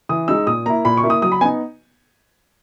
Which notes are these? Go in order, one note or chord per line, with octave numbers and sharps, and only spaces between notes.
E3 D#6
G#3 D#4 E6
A#2 D#6
A#3 E4 A#5
A#2 B5
C#6
A#3 E4
D#6
F#3 D#6
B5
B3 D#4 G#5